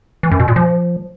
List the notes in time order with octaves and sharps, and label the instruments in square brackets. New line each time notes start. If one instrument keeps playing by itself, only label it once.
[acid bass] E3
F#2
B2
A#2
F3